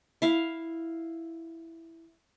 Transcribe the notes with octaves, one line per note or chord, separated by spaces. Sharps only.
E4 F5